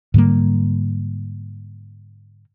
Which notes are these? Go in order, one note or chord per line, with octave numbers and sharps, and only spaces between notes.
G#2 D3 G3 A#3